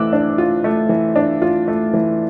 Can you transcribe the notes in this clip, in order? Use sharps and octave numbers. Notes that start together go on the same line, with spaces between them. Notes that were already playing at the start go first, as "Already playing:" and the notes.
Already playing: E3 A3 D6 E6 F#6
D4
F4
A3
E3
D4
F4
A3
E3